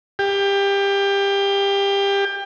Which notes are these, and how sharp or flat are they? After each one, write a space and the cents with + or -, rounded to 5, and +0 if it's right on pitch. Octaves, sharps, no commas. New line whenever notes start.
G4 +20